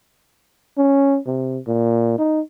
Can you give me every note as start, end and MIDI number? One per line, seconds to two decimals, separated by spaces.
0.78 1.18 61
1.26 1.59 48
1.67 2.17 46
2.18 2.41 63